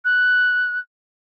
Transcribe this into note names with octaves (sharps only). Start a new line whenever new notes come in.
F#6